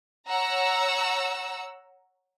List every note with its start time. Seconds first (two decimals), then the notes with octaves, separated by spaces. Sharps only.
0.30 C#5 F#5 A#5 E6